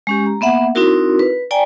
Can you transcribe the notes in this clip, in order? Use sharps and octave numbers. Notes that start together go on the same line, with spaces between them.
G#3 C#4 G4
A#5
A#3 B3 E5 F#5
C4 D#4 E4 F#4 A#4
B4
D5 G5 G#5 A#5